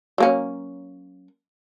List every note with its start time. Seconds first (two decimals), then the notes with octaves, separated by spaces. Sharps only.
0.18 F#3 A#3 C#4